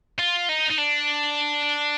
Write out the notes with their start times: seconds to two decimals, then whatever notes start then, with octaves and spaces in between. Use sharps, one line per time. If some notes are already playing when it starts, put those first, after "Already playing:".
0.19 F4
0.49 D#4
0.70 D#4
0.79 D4